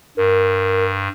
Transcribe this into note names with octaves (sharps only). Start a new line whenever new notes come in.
G2 A#4